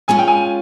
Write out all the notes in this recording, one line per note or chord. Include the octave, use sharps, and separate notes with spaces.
G#3 C#4 F4 G#5
G5
G#5